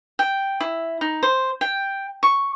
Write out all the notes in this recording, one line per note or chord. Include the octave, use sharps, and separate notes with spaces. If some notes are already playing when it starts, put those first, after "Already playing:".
G5
E4
D#4
C5
G5
C#6